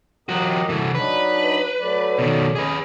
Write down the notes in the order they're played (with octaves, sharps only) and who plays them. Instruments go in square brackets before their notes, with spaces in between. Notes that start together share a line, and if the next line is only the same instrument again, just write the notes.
[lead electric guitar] F3 F#4 [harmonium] G4 A#4 D#5
[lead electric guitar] C2 E3 [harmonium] F#4 A4
[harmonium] F#3 D4 D#4 [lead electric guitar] B4
[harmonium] F#3 A3 D5
[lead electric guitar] B2 D#3
[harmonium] C#4 D#5 [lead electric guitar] G#4 B4